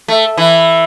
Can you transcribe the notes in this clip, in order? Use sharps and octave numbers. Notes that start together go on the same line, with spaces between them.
A3
E3